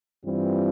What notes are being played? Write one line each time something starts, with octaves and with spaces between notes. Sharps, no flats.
G2 E3 G3 C4 F4